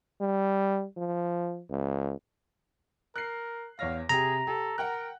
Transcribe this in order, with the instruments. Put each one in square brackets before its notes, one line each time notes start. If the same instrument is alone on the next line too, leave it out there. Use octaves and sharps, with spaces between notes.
[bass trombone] G3
F3
C#2
[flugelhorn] A#4 [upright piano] F#6 C7
[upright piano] E2 C#5 A#6 [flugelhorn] F5
[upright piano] C3 G4 [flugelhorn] G#4 [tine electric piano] A#5
[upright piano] G4 [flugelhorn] A4
[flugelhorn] A#4 [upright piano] F#5 G5 F#6